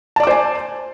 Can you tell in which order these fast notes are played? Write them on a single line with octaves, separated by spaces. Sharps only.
A5 D5 D6 C5 G#5